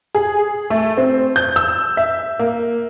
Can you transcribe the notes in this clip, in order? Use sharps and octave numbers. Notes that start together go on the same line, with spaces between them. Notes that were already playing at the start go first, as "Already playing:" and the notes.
G#4
A3
C4
G6
E6
E5
A#3